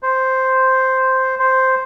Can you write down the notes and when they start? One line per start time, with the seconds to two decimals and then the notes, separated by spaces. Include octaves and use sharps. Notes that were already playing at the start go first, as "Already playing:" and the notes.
0.03 C5
1.39 C5